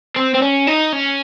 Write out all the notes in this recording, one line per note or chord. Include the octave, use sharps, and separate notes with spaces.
C4
C4
C#4
D#4
C#4